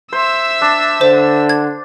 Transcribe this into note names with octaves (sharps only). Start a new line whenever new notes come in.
C5 E5 E6
D4
D3 C5
G#6